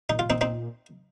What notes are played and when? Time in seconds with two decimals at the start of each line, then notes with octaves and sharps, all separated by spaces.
0.09 A#2 D#4
0.19 F4
0.26 A#2 C4 D#4
0.41 C4 D#4